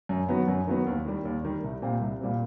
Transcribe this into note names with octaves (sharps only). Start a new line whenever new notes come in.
F#2
D#3 F#3 B3
F#2
D#3 F#3 B3
D#2
D#3 G3
D#2
D#3 G3
C2
A#2 G3 C4
C2
A#2 G3 C4